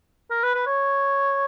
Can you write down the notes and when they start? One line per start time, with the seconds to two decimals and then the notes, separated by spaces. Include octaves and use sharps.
0.31 A#4
0.43 B4
0.55 B4
0.66 C#5